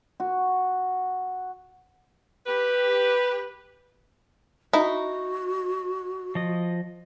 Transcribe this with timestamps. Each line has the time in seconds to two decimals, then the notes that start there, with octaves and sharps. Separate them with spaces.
0.20 F#4
2.47 G4 B4
4.73 D#4 E4 F#4
6.35 F3 D#5